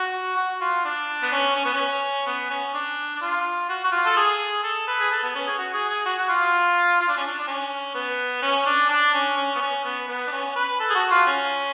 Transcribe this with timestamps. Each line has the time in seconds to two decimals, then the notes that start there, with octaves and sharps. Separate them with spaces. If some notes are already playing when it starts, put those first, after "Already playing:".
Already playing: F#4
0.36 F#4
0.61 F4
0.85 D4
1.23 B3
1.32 C#4
1.55 C#4
1.65 B3
1.74 C#4
2.26 B3
2.50 C#4
2.74 D4
3.15 D4
3.22 F4
3.69 F#4
3.84 F#4
3.92 F4
4.06 A4
4.17 G#4
4.63 A4
4.87 B4
5.00 G#4
5.11 A4
5.23 B3
5.35 C#4
5.47 G#4
5.58 F#4
5.74 G#4
5.89 G#4
6.06 F#4
6.19 F#4
6.29 F4
7.01 F4
7.09 D4
7.17 C#4
7.26 D4
7.39 D4
7.48 C#4
7.95 B3
8.42 C#4
8.66 D4
8.90 D4
9.14 C#4
9.37 C#4
9.56 B3
9.61 C#4
9.85 B3
10.08 B3
10.27 D4
10.32 C#4
10.56 B4
10.80 A4
10.90 G#4
10.95 F#4
11.11 F4
11.27 C#4